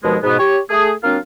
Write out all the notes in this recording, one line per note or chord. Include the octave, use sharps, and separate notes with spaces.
D#2 B2 F3 G#3
G#2 B2 B3
G4 C#5
A3 G#4
F#3 A#3 C4 D4 F4 F5